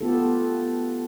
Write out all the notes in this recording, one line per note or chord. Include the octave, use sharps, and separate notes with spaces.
B3 F4 G4 A4